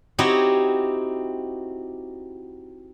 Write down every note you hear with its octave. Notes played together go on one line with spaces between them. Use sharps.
C4 D#4 E4 F#4 G4 C#5